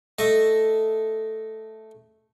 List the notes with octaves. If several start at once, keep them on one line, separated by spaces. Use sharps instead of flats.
A3 D#5 E5